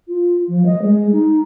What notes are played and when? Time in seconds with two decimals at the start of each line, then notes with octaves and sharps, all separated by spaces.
0.08 F4
0.48 F3
0.66 D#5
0.81 G#3
1.12 D#4